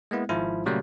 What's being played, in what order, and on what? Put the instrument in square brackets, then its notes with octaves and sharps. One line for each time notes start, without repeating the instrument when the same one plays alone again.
[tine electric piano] G#3 A#3 B3 E4
G#1 G#2 F3 E4 F4
A#2 C#3 F#3 G3 A3 A#3